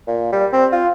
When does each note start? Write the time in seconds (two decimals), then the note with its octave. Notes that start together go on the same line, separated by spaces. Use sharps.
0.07 A#2
0.32 G3
0.53 C4
0.72 F4